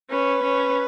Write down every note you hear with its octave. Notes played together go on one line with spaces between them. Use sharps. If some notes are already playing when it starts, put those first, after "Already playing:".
C#4 B4
C#4